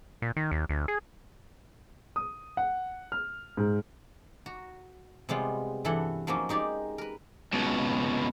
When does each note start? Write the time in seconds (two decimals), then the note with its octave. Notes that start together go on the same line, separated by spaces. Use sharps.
0.22 A#2
0.37 D#3
0.52 D#2
0.69 D2
0.88 G#4
2.16 D#6
2.57 F#5
3.12 F6
3.57 G#2
4.46 F#4 A#5
5.29 C3 G3 G#3 B3 F4
5.85 G2 E3 E4 A4 F#5
6.27 F3 F#3 A#3 C4 C#4 D#4
6.49 G#3 D#4 G4 D5 G#5
6.98 A#4 B4
7.53 C#2 B2